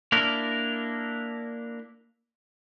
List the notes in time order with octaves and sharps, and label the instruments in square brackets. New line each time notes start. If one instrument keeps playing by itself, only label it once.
[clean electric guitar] A#3 D4 E4 A#4